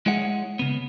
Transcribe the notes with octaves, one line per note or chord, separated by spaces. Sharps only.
G#3 E4 G#4 C#5 E5 F#5
C#3 B3